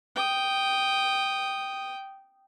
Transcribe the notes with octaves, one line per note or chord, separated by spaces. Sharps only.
G5 D#6